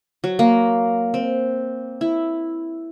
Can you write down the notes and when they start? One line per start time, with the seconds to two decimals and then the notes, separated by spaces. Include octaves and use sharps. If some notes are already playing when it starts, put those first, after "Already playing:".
0.24 F#3
0.39 A#3
1.14 C4
2.01 E4